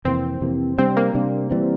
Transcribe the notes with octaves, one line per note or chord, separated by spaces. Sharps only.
F2 C3 E3 A#3 C4
F2 C3 E3 A#3
C3 G3 C4 D4
A#3
C3 G3 D4
E3 G3 C4